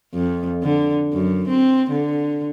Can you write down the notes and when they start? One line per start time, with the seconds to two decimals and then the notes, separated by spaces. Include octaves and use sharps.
0.14 F2
0.63 D3
1.13 F#2
1.48 C4
1.90 D3